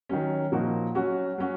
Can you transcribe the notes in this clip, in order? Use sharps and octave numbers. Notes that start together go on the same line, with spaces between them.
D#3 F#3 C#4
A#2 F3 A#3 D#4 F#4
F#3 C#4 F#4
F#3 C#4 F#4